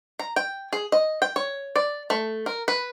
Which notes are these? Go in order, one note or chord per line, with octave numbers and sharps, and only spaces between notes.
A#5
G5
G#4
D#5
G5
C#5
D5
A3
A#4
B4